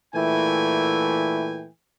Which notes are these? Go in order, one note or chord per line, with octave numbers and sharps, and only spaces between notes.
A#2 E3 A3 E4 G5 G#5